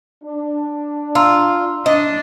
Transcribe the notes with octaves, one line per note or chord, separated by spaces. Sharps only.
D4
F4 A#5 C6 E6
D4 D#5